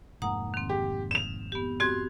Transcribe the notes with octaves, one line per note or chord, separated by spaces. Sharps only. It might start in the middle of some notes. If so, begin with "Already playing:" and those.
F1 G#2 A#3 F#5 A#5 D#6
D#3 C4
G4
E7 F7
B3 G4
C4 F#4 G4 C6 G#6